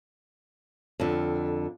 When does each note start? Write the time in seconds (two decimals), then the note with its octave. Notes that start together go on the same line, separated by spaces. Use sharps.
1.00 F2 D3